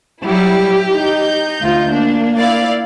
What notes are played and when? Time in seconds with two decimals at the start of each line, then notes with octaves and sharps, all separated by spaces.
0.25 F#3 G3 E4 G4
0.92 D#4 G6
1.61 D2 F4
1.92 A#3 D4
2.38 E4 D5 F5